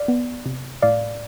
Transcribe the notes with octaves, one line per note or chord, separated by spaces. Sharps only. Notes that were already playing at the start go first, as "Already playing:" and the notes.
Already playing: D5 F5
B3
C3
A2 D5 F5